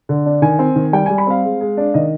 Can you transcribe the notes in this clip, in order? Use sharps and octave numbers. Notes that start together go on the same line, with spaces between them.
D3
D4
D#3 G#5
C4
D#3
G3 G5
G3 G#5
B5
C4 F5
G#3
G#3
D4
D#3 D#5